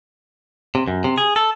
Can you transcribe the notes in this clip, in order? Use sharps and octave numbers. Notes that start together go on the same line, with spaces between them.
C3
F#2
C3
G#4
A4